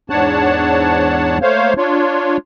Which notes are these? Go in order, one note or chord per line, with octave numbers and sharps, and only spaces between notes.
E2 G#2 D4 C#5 F#5 A5
A3 A#3 C5 C#5 F5
D4 F4 C#5